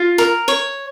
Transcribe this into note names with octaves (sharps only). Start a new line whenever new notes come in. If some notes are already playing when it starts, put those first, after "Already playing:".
Already playing: F4
A#4
C#5